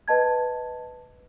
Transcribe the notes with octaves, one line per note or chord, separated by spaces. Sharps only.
B4 D#5 A5 G#6